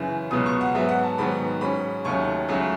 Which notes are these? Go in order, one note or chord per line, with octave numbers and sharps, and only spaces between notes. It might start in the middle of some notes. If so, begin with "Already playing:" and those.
Already playing: F#2 C#3 E3
C#2 B2 F#3 B3 D#6
C#6
F#5
G#2 F#3 B3 E5
F#5
A5
G#2 D#3 F#3 B3 B5
G#2 F#3 C#4 B5
D#2 D#3 F#3 A3 C#4 C#6
C#2 C#3 F#3 A3